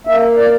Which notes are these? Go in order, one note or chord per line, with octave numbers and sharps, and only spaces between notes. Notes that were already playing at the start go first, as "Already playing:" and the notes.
A#3 E5
D5